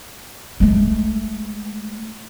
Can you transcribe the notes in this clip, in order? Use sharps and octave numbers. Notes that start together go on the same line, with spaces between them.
G#3 A3